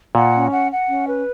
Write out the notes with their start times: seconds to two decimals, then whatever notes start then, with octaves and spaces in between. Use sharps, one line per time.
0.15 A#2 F#5
0.34 C#4
0.52 F#5
0.71 F#5
0.89 C#4
1.08 B4